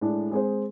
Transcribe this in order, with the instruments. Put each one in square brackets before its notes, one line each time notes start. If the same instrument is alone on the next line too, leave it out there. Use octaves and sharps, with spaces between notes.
[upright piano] A2 G#3 D4
G#3 C4 G#4 C5